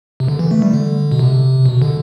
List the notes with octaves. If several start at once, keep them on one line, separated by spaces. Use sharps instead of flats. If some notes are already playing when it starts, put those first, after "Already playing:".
C3
D3
E3
A3
G3
D3
B2
C3
B2
D3